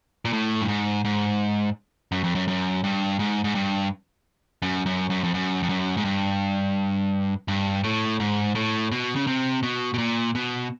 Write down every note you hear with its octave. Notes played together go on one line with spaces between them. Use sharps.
A#2
A2
G2
G#2
G#2
F#2
F2
F#2
F#2
G2
G#2
G#2
G2
F#2
F#2
F#2
F2
F#2
F2
F#2
G#2
G2
G2
A2
G#2
A2
B2
C#3
C3
B2
B2
A#2
B2